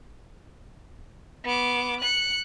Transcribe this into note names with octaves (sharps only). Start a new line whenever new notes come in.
B3 D6
F#6 C#7